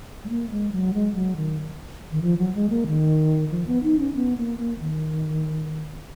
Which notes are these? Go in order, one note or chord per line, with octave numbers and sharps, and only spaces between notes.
G#3
A#3
G#3
F#3
G#3
F#3
D#3
D#3
F3
F#3
G#3
A#3
D#3
F3
B3
D#4
C#4
B3
A#3
A#3
D#3